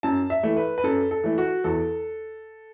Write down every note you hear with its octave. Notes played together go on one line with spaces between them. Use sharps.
F#2 A5
E5
E3 A3
B4
B4
F#2 A4
A4
E3 A3
F#4
E2 A4